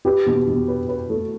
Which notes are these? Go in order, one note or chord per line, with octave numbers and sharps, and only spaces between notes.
G4 B4
B2
B2
B4
B4
A3